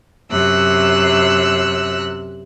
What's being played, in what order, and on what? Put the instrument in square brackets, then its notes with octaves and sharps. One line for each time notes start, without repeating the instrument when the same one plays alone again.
[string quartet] F#2 C3 E6 F#6